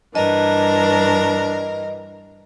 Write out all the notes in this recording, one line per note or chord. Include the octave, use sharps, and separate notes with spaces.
G2 E3 D4 A#4 D#5